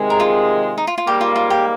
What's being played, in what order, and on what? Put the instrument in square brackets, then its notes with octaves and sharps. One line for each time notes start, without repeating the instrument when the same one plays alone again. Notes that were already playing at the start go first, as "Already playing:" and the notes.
Already playing: [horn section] C3 D#3 G#3
[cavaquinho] A#4
F4
D#4
F4
F4
[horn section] G#2 G3 A#3 [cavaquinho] G4
[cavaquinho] F4
F4
G4